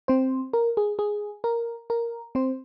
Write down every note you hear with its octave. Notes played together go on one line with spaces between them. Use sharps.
C4 C5
A#4
G#4
G#4
A#4
A#4
C4 C5